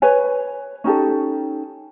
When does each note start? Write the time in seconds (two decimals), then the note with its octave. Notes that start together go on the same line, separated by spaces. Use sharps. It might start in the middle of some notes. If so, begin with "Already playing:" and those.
0.02 B4 C#5 G#5
0.84 C#4 D#4 G4 A4